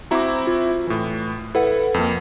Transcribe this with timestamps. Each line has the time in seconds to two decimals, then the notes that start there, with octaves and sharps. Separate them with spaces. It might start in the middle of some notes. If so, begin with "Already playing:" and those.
0.11 C4 E4 F#4 A#5 D6
0.47 F4
0.87 A2 E3
1.55 E4 A4 B4 F#5
1.94 F2 A#3